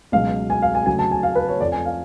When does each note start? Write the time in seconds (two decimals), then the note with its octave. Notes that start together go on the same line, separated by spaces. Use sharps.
0.12 C#2 B2 F#3 F5
0.50 G#5
0.62 F5
0.75 G#5
0.86 D2 C#3 F#3 G#5
0.99 A5
1.11 G#5
1.23 F5
1.35 B4
1.48 C#5
1.60 F2 D5
1.65 F3
1.72 G#5
1.86 F5